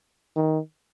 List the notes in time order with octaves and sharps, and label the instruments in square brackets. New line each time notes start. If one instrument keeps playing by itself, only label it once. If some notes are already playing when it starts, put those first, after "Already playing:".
[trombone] D#3